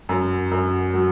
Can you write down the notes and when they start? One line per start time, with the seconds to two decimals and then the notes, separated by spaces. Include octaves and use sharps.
0.09 F#2
0.51 F#2
0.94 F#3